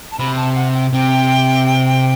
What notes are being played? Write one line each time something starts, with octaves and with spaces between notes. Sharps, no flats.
A5
C3 B5
A5
F#5
G5
C3 G5